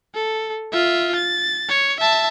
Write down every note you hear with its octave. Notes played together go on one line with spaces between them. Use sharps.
A4
F4 E5
A6
C#5
E5 A5